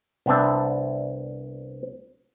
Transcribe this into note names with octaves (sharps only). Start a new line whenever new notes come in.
C2 B3 C4 D4 E5